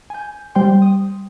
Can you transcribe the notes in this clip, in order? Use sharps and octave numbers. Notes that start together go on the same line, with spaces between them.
G#5 G6
G3 C5 G5 C6
D#6